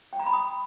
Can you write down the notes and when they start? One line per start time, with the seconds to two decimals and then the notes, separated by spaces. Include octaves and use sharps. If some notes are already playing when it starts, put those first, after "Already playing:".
0.13 G5
0.20 A#5
0.26 B5
0.33 D#6